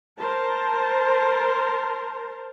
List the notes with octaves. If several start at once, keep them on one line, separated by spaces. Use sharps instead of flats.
A#4 C5 A5